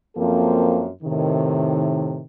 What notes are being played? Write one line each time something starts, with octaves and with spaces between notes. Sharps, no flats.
F#2 F3 A#3 C4 A4
A2 C3 D#3